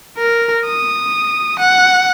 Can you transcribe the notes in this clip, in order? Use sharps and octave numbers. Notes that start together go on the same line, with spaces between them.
A#4
D#6
F#5